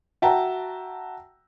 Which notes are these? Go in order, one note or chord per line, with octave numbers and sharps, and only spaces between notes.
F#4 E5 G5 A5 A#5